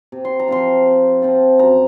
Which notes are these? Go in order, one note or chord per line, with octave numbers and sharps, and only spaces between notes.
C3
C6
A#5
F3 C4 F4 C6
C3
F3 C4 F4
F#2 A#5